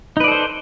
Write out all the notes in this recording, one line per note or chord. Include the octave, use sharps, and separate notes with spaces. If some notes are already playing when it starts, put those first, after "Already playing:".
D#4 A4 B4 C5 D5